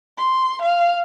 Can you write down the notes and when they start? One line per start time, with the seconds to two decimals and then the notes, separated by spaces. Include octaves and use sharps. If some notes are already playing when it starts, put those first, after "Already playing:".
0.18 C6
0.62 F5